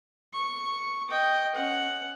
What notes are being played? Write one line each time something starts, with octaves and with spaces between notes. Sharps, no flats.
C#6
D#5 G5
C#4 F#5